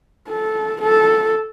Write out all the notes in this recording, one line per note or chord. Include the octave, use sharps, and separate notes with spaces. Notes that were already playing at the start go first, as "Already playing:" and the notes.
A4
A4